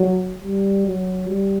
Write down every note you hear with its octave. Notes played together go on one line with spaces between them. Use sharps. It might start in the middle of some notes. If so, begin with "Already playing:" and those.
Already playing: F#3
G3
F#3
G3